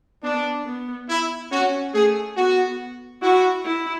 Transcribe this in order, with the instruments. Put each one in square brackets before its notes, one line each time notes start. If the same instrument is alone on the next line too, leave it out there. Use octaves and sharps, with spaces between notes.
[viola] B3 [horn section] D4
[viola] B3
[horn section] E4
[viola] C#4 [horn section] F#4
[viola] A3 [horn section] G#4
[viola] B3 [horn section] F#4
[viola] E4 [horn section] F#4
[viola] E4